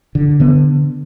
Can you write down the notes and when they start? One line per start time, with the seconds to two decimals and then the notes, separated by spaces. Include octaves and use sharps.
0.15 D3
0.40 D3 B3